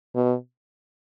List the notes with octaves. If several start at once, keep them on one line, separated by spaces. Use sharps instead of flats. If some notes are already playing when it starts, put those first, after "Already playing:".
B2